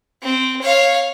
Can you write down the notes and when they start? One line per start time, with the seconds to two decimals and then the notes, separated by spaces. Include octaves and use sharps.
0.23 C4
0.61 C#5 F5